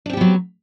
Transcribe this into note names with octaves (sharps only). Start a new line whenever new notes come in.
F#3 B3 C4 D4 G4